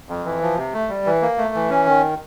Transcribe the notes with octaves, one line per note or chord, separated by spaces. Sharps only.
F2
E3
F3
C3
A3
G3
E3
A#3
A3
E3
C#4
D#3